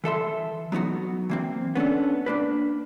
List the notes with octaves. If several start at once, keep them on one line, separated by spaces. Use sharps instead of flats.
E3 A4 E5 C6
F#3 B3 D#4 F#4
E3 A#3 C4
B3 C#4 D4 A4
A#3 D4 B4